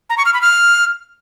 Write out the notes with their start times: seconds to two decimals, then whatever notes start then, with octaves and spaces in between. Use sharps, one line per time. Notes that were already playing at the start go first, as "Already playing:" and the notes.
0.10 A#5
0.18 C#6
0.26 F6
0.34 B5
0.42 F6